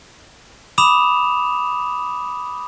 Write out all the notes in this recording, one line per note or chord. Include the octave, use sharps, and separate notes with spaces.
B5 D6 D#6 E7 F7